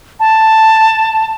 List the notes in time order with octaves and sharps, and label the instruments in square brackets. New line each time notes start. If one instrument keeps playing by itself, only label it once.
[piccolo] A5